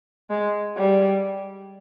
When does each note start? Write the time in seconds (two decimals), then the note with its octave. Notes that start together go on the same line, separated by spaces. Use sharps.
0.30 G#3
0.77 G3